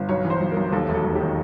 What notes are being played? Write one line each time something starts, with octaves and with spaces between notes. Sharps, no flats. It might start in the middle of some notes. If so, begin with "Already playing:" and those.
Already playing: G1
B1 C#5
E3
C5
B1
B1 A#4
D#2 A4
E1
A4
D#2
G4
D#3